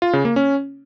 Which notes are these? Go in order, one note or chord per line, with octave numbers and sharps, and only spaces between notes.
F4
C#3
A#3
C#4